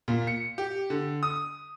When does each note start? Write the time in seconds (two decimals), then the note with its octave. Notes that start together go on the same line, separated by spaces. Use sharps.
0.08 A#2
0.27 C#7
0.58 G4
0.90 D3
1.23 D#6